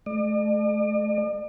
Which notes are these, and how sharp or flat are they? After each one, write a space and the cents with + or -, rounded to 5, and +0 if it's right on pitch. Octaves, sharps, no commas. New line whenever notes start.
A3 -35 D5 +45